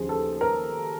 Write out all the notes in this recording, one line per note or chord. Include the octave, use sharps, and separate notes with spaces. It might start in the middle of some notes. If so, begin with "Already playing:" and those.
Already playing: D#2 C#3 F3 G#4
A4
A#4